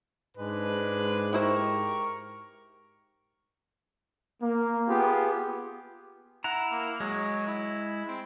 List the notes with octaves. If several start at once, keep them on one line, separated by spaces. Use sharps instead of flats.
G#2 G#3 D4 B4
D#4 E4 G4 A#4 C5 C#6
A#3
B3 F4 G4 G#4
E4 F#5 A#5
A#3
F#3 G#3
E4
C4